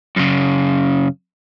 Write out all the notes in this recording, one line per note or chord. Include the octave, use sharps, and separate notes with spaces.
F#2 C#3